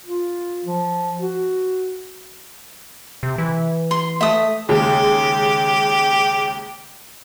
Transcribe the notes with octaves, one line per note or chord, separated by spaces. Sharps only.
F4
F3
F#4
C3
E3
C6
A3 E5 D#6
D#2 C#3 G#3 G4